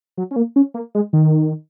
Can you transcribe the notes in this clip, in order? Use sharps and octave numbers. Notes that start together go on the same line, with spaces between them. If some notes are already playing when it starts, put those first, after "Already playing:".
F#3
C#4
A#3
C#4
A#3
G#3
D#3